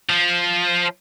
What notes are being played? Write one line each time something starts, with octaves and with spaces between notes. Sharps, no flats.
F3